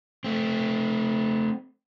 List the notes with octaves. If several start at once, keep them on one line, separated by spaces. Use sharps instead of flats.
A3 C4